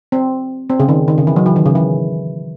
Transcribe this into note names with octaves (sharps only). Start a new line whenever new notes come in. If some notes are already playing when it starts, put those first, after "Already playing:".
C4
C4
C#3
D#3
D#3
C#3
E3
F#3
E3
D#3
C#3
E3